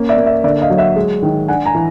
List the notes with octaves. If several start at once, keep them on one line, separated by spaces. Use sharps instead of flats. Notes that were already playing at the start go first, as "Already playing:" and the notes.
Already playing: A#3 C#4
D5 E5
A#3
D5 E5
D3 D5 E5
D#5 F5
F#3
E5 F#5
G#3
D#3
D4 F#5 G#5
G#5 A#5
E3